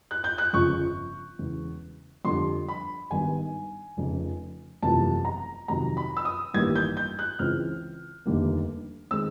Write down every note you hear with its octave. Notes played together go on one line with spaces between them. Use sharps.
F#6
G6
F#6
G1 F2 C#3 F3 C#6
E1 E2 C#3
F2 D3 G3 C6
B5
G#1 G2 D#3 G3 B3 G#5
F1 F2 C#3
F#1 E2 C3 F3 A3 A5
A#5
F2 C3 D#3 F#3 A#5
B5
E6
D#6
A1 G2 D#3 G3 A#3 G#6
G6
G6
F#6
C#2 C#3 E3 G#3 C4 F6
F1 D#2 D3 G3 A#3
D#3 G#3 C4 E6